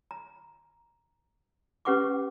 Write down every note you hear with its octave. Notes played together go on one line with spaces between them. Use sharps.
A#5
C#4 G4 B4 F#5 C#6 D6